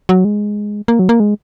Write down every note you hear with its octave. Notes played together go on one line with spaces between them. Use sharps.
F#3
G#3
A#3
F#3
A#3
G#3